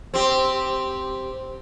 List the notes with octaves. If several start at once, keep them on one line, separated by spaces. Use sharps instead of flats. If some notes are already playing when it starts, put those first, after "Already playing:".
C4 G4